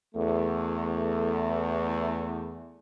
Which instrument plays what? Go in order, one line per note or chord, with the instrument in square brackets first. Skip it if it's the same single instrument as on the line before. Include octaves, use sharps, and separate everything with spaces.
[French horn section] E2 A3